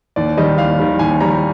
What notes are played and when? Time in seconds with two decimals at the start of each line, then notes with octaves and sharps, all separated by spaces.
0.16 D#2 D5
0.37 D#3 G3 D#5
0.58 D#2 F5
0.79 D#3 G3
0.99 D#2 G#5
1.20 D#3 G3 A#5